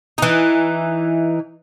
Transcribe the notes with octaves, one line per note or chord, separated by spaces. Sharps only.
E3 D#4